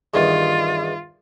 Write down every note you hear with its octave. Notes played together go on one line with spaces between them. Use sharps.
E2 G2 D#3 F4